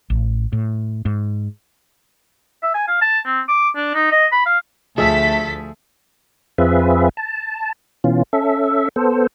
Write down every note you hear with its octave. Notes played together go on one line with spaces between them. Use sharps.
A1
A2
G#2
E5
G#5
F5
A5
C4
D6
D4
D#4
D#5
B5
F5
D2 F3 A3 G#4 A4 E5 B6
F2 C4 F4 G#4 B4 E5
A5
B2 E3 C#4 F4
C#4 A4 E5
B3 A4 C5